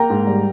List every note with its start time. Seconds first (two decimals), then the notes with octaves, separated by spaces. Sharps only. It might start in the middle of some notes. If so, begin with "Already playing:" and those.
Already playing: A#3 G5 A#5
0.10 G#2
0.27 G3